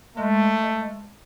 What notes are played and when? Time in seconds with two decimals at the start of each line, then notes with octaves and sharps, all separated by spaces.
0.17 G#3 A3